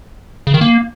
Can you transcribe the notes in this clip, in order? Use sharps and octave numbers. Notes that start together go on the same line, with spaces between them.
C#3
D#3
A#3